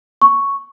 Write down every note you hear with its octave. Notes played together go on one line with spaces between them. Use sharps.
C#6